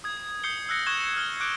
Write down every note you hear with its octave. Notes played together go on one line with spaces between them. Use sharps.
D#6 G#6
D#6 G6 C7 C#7 G7
E6 F#6 A#6 C#7
C#6 D#6 F#6 G#6 E7 G7
F6 G7
D6 F#6 G6 D7